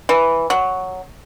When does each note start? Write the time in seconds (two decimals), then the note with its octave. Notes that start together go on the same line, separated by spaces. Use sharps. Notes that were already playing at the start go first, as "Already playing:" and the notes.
0.09 E3
0.50 F#3